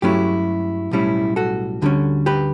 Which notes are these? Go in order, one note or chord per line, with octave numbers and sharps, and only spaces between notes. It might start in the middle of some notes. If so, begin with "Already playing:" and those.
G2 F#3 A3 C#4 E4 G4
B1 A2 G3 C#4 E4
F#4 A4
D2 D3 G3 C#4
G4 B4